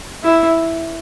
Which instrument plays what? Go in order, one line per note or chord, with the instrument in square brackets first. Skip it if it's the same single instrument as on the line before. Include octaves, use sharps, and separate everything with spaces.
[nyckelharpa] E4